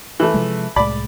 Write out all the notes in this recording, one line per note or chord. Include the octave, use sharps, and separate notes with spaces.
E3 A3
C3 F3 G#3
C2 A2 G#3 D5 B5